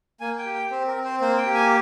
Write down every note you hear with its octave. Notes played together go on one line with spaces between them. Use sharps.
A#3 G#5
G5
G4
G5
C4 C5
A#4
C4
C5
A#3 C5
G5
G4
G#5